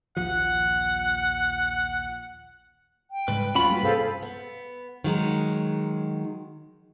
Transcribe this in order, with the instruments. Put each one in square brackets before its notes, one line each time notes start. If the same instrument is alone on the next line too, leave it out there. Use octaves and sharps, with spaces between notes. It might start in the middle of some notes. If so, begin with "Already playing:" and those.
[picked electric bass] A#1 D#2 F3 [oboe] F#5
[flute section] G5
[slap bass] G#2 C#3 G3 [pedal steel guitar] B4
[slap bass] D2 G3 [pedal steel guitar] C#4 F#4 B5 [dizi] F4
[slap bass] G3 A#3 [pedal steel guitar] B4
[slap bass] G2 C3 [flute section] G#4 C5 F5 [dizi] A4
[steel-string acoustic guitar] B3
D#3 F#3 G#3